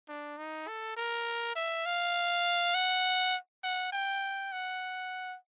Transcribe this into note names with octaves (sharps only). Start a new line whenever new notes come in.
D4
D#4
A4
A#4
E5
F5
F#5
F#5
G5
F#5